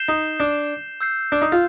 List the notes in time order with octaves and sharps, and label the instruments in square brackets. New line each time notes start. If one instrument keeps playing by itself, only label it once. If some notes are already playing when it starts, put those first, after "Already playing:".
Already playing: [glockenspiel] G6 C7 E7 G7
[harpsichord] D#4
D4
[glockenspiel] E6 G6 C7
[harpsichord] D4
D#4
F4